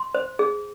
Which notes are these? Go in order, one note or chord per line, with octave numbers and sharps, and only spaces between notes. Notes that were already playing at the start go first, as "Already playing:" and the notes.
Already playing: C6
C5
G#4